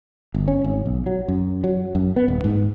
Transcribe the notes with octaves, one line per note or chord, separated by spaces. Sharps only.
G1
C#4
G#1
B1
F#3
F#2
F#3
F#2
B3
D#1
G#2